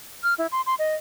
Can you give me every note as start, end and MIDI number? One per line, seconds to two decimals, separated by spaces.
0.23 0.34 89
0.38 0.47 64
0.52 0.61 84
0.66 0.75 84
0.79 0.95 75